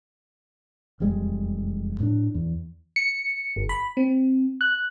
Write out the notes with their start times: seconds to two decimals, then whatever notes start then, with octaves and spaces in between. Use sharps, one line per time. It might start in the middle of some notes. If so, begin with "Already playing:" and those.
1.00 E1 F2 G3 G#3
2.00 A2 D4
2.34 E2
2.96 C#7
3.56 G1
3.69 B5
3.97 C4
4.61 F#6